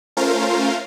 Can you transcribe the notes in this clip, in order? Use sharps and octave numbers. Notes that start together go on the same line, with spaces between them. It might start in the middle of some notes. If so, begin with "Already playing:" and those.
A3 C#4 F4 A#4 C5 F5